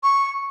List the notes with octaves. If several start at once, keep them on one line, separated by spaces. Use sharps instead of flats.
C#6